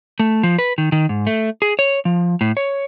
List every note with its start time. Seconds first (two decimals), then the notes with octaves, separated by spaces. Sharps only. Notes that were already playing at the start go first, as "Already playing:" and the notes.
0.20 A3
0.43 F3
0.59 B4
0.78 D#3
0.92 D#3
1.09 G#2
1.27 A3
1.62 G#4
1.79 C#5
2.05 F3
2.41 A2
2.57 C#5